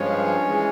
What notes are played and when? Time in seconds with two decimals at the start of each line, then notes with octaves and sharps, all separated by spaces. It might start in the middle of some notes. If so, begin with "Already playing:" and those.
Already playing: G2 F3 G#3 C#4
0.48 E3 G#3